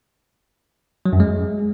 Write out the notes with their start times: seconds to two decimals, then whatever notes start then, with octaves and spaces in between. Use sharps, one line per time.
1.06 F#3
1.13 F#2
1.20 G#3